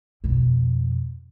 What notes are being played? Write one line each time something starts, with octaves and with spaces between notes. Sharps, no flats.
F2 B2